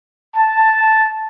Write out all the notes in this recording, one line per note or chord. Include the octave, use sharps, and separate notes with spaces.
A5